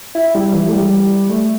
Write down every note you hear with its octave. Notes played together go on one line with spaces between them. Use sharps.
E4
G3
E3
A3
G3
A3